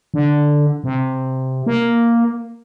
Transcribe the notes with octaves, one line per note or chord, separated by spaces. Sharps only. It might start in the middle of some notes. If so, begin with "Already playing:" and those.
D3
C3
A#3